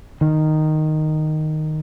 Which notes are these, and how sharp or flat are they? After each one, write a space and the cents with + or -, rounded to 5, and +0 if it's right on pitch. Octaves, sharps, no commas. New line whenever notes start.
D#3 -5